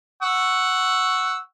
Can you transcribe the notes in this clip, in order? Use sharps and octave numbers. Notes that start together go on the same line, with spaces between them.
F#5 C#6 E6